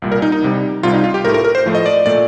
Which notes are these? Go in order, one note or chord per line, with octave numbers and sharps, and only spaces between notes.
C2 A#2 G3
A#4
D#4
D#4
C2 C3 G3
C2 C3 G3 F4
D#4
F4
G4
A2 A3 A#4
A#4
A#4
C5
A2 F3 A3
D#5
D5
A#2 A3 D5